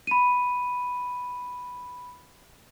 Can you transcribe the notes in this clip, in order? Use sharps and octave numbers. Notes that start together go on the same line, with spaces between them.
B5 D#7